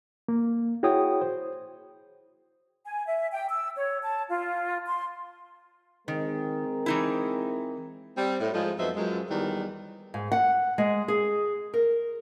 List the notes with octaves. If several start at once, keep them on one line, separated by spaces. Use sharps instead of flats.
A#3
E4 F#4 G#4 C#5 G5 D#6
C5
G#5
E5
G5
E6
C#5
A5
F4
C6
D#3 G#3 C4 A#4
E3 D#4 E4
G3 C4
A2
G#2 F3 G#3
F2 F#3 B3 D#4 C5 E5
F#2 F3 G#3
E2 D#3 F#3 G3
G#2
F#5
G#3
G#4
A#4